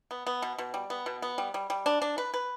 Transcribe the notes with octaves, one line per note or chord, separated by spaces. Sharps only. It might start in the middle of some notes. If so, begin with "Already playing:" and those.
B3
B3
B2
B2
G3
B3
B2
B3
G3
G3
G3
D4
D4
B4
B4